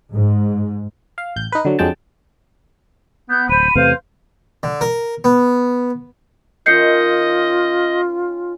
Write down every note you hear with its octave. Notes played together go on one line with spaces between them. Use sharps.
G#2
F5
A1 G6
D#4 B4
D3 F#3
F2 D3 F#3 G#3 G5 A5
B3 G6
D1 C5 B5 D#7
E2 C3 A3 B4 C5 F5
D3
A#4
B3
D#3 C#4 F4 D#5 E5 G6 C7 C#7